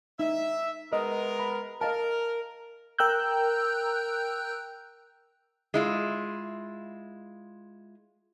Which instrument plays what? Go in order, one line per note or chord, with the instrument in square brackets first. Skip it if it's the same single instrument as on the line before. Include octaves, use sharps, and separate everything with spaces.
[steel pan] D#4 [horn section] E5
[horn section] G#3 B3 A#4 [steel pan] D#5
[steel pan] B5
[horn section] A#4 [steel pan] D#5 F5 A5
[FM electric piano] A#4 G5 A#5 E6 F#6 G6
[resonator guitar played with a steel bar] G#3 E4 F4